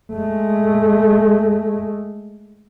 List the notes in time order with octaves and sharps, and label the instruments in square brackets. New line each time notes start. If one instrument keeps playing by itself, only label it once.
[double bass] G#3 A3